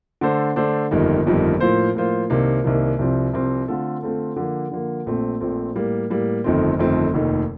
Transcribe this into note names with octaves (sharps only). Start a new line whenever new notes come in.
D3 A3 D4 A4 C5
D3 A3 D4 A4 C5
G1 F2 D#3 G3 A#3
G1 F2 D#3 G3 A#3
A2 F3 A#3 F4 C5
A2 F3 A#3 F4 C5
C2 C3 D#3 A#3
C2 C3 D#3 A#3
C2 C3 F3 C4
C2 C3 F3 C4
D3 A3 C4 F4 A4
D3 A3 C4 F4 A4
D3 F3 A#3
D3 F3 A#3
A#1 A#2 A3 C4
A#1 A#2 A3 C4
A2 G3 A#3
A2 G3 A#3
G1 F2 D#3 A3 C4
G1 F2 D#3 A3 C4
F1 D#2 D#3 A3